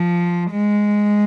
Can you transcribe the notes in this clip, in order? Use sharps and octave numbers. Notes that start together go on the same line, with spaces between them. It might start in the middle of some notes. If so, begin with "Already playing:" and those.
Already playing: F3
G#3